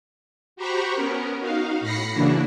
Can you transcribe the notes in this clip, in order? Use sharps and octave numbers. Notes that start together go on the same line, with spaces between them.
F#4 G4 C5 A#5 B5 C#6
B3 C#4 A#4
D#4 F#4 F5
A2 B5 A#6 C7 C#7
C#3 E3 A#3 D4 E4 F#4